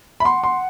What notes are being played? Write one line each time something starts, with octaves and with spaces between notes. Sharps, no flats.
E5 B5
F#5 C6
C6